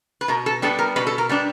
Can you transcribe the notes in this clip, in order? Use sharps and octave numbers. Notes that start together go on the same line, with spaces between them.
B4
B2 A#4
A4
G3 B3 D4 A4
A#4
B2 B4
A4
A#4
G3 B3 D4